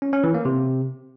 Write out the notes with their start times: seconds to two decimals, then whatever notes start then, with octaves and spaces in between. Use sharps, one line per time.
0.02 C#4
0.13 C#4
0.24 E3
0.34 A#3
0.45 C3